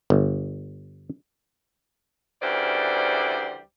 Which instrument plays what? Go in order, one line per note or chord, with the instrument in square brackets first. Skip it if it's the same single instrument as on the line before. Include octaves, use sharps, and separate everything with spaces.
[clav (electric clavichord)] G1
[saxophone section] D2 C#3 E3 G3 C5 D5